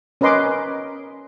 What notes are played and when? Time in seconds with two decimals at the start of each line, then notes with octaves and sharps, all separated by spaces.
0.21 C#4 A#4 B4 D#5 C6 D6